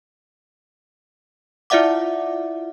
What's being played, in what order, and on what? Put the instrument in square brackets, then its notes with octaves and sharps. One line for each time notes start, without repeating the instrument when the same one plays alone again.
[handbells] E4 F4 D5 E5 F#5 D6